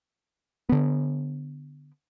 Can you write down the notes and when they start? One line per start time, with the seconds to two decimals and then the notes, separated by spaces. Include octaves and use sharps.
0.69 D3 B3